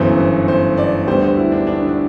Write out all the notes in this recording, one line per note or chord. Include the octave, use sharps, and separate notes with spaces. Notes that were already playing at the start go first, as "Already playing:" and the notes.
Already playing: G1 F#2 E3 B3 C5
C5
C5
D5
D2 D3 G3 B3 C5
C5
E4
D4
D4
D4